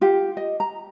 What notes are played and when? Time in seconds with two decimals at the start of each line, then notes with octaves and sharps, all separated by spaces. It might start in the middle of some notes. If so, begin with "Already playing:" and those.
0.01 F4 G4
0.37 D#5
0.60 A#5